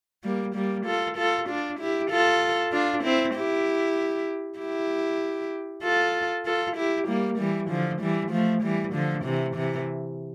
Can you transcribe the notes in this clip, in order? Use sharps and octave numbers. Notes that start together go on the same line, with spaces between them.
G3 A#3
G3 A#3
F4 A4
F4 A4
D4 F4
E4 G4
F4 A4
D4 F4
C4 E4
E4 G4
E4 G4
F4 A4
F4 A4
E4 G4
G3 A#3
E3 G3
D3 F3
E3 G3
F3 A3
E3 G3
D3 F3
C3 E3
C3 E3